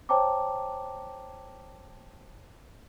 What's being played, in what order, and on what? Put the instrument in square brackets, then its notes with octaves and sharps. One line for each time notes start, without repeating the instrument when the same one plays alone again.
[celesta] C5 C#5 G5 A5 A#5 D6